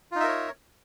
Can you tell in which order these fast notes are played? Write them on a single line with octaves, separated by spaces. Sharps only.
F4 D#4 E5 A#4 C#5